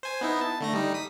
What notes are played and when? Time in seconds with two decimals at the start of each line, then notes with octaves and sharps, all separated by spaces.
0.03 C5 G#5
0.21 B3 D#4 E4
0.41 A5
0.60 D3 A3 A#6
0.73 G3 D#4
0.94 D#6 B6